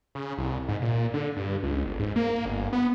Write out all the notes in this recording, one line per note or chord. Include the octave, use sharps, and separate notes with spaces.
C#3
C2
G#2
A#2
D3
G2
C#2
G1
G#2
A#3
G1
B3